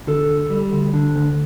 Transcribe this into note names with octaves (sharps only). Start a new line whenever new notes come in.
D3 A4
D2
G3
D2
D3
D2